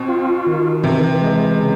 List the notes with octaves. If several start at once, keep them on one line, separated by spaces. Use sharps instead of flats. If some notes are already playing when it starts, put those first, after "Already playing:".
Already playing: B2 C4
F4
D#3
C3 E3
G#3
C#3